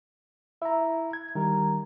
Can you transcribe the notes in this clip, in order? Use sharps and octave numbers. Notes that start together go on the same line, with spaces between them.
E4 E5 A#5
G#6
D#3 G3 A#4